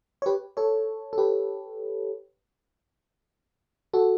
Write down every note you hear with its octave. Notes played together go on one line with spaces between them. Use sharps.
C#5
G4 B4
A4 C#5
A4
G4 B4
F#4 A4